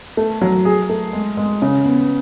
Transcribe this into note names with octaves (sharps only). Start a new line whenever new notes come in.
A3
F#3
G#4
A3
G#3
G#3
C#3
B3